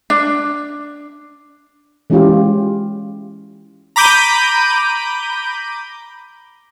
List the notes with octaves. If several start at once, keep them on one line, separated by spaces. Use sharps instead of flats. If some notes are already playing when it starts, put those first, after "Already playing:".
D4
E3 G#3 C#4 E4 F4 G4
A#5 B5 D6 G6 D7 D#7